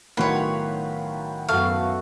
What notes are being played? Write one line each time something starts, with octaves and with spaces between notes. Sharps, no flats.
B1 A2 D#3 F#3 F4 B4 C#5 B5
F#2 A3 B3 F#4 F5